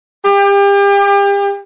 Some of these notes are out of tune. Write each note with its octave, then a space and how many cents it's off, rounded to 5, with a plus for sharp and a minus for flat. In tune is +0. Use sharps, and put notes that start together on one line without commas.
G4 +35